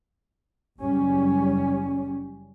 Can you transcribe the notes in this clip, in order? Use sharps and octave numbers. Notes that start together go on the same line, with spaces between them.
F#1 G3 C#4